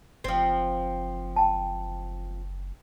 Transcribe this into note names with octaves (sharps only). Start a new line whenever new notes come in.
F#1 F3 C4
G5 A5